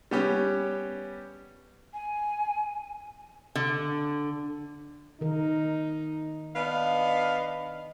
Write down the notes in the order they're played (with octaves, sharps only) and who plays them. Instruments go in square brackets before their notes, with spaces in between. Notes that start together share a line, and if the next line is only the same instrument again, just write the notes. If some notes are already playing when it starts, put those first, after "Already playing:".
[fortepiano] G3 B3 C#4 G4
[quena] G#5
[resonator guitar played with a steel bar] D3
[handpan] D#3 A#4 [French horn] D#4
[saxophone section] B3 D4 F5 [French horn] D#5